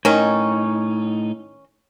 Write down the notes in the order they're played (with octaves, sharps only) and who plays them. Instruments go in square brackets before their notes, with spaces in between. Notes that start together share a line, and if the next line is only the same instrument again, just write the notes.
[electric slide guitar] A2 D#4 [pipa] D#3 C#4